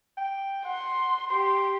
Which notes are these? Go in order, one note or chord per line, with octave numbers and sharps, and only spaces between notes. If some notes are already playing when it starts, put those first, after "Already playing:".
G5
F#5 C6
G4 C6